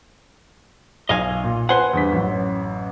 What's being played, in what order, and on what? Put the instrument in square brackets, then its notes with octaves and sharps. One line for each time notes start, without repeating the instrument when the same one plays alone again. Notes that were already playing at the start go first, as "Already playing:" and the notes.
[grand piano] B1 [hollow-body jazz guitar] D#5 F5 G#5
[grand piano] A#2
[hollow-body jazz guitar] B4 C5 F#5 [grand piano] G#5
[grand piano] E2 G2 B6
A1 F#2